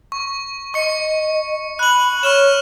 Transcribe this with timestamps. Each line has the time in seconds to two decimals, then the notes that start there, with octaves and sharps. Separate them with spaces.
0.12 C#6
0.74 D#5 C#6 C#7
1.79 B5 F#6 F#7
2.23 C#5 C#6 F6 E7